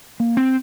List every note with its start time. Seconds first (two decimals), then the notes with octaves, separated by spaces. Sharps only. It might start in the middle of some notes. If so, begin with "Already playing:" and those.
0.20 A#3
0.37 C4